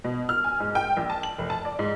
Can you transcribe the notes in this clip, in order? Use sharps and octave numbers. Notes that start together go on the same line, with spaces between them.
B2
F6
G#5
G#2
G5
A#1
A5
F#7
F1
A5
D5
G#2